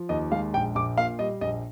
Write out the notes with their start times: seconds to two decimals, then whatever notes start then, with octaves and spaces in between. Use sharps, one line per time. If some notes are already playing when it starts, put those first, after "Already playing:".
Already playing: F3
0.09 D#2 D#5
0.32 G#3 F5
0.54 A#1 G5
0.75 A#1 D6
0.98 A#2 F5
1.19 G3 D#5
1.41 A#1 D#5